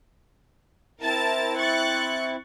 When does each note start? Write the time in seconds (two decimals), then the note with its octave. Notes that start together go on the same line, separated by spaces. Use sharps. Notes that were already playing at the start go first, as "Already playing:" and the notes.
1.01 C4 E4 A#4 A5 A6
1.58 C#6 F#6 A6